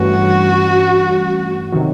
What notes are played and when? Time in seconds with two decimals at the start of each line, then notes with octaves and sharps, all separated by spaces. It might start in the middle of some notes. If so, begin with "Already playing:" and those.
Already playing: G2 E3 A3 C#4 F#4
1.72 C3 D#3 F#3